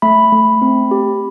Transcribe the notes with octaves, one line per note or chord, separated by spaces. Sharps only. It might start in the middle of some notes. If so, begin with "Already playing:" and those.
A3 B5
A3
C4
G4